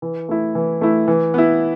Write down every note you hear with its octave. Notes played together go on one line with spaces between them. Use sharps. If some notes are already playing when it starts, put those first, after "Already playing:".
E3
A3 E4
E3
A3 E4
E3
B3 E4